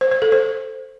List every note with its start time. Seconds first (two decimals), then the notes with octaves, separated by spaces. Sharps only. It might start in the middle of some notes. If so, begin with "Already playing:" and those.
0.01 C5
0.11 C5
0.22 A4
0.32 C5